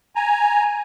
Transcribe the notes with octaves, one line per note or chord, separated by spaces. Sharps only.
G#5 A#5